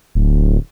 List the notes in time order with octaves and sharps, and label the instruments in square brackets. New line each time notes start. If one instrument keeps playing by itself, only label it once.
[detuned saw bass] D1